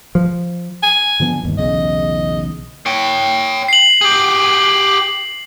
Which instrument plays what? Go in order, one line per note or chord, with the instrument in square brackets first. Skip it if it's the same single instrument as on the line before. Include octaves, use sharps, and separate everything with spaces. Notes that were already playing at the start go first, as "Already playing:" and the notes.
[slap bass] F3
[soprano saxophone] G#5
[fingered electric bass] D3 F3 B3
G1 D#2
[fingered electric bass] B1 E2 C#3 [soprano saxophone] D#5
[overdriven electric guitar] C#5 G5
[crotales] C7 F#7
[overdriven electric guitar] G4 G#4